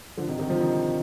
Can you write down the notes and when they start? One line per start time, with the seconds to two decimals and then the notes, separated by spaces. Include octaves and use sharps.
0.17 D3 F3
0.28 C3 D#3
0.39 C3 D#3
0.49 D3 F3
0.60 C3 D#3